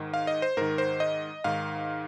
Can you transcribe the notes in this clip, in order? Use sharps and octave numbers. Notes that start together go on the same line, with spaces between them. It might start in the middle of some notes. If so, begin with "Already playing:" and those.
Already playing: G#2 D#3
F5
D#5
C5
G#2 D#3 A#4
C5
D#5
G#2 D#3 F5